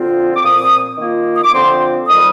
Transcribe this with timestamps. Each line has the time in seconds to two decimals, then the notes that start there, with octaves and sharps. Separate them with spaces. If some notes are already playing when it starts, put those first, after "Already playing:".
Already playing: D3 F3 C4 F4
0.36 D6
0.42 A#2 F3 C4 D#6
0.97 D#3 A#3 F4
1.35 D#6
1.44 D6
1.52 D3 F3 C4 F4 C6
2.07 F2 D#3 G3 D#6